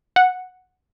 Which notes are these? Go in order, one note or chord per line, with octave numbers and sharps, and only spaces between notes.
F#5